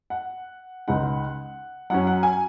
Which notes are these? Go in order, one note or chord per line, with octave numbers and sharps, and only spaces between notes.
F#5
C#2 C#3 G#3 D#4 F#5
F#2 F#3 C#4 F#5
F#5
G#5